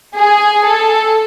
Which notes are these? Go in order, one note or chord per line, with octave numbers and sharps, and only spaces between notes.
G#4
A4